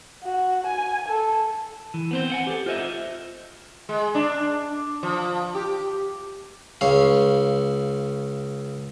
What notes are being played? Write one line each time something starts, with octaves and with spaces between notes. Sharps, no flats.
F#4
G#5
A4
E3
B3 C4 C5
F#5 G#5
G4 A4
F4 C5 D#5 E5
G#3
D4
F3
G4
C#2 C#5 F5